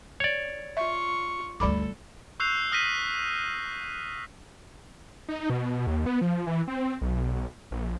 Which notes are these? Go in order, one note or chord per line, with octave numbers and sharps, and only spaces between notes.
C#5 D5
F4 E5 C#6
G1 D2 G3 A4 B5 D6
C#6 E6 F#6 G6 C7 F7
D#6 F6 A#6 B6 D#7
D#4
B2
D#2
B3
F3
E3
C4
B1
A#1